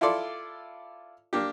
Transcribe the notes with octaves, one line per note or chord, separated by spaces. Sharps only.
E4 F4 A4 D5 C6
A#3 D4 G4